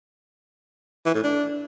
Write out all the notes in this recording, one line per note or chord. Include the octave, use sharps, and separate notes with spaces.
E3
A2
D4